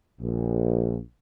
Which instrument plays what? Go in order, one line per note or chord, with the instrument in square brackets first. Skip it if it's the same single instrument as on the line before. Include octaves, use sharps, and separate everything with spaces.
[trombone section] A#1